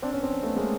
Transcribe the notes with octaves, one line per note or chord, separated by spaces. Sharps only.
C4 D4
B3 C#4
C4 D4
A3 B3
G#3 A#3